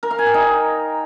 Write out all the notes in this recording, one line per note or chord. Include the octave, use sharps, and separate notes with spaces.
A#4
F5
G#5
G5
D#4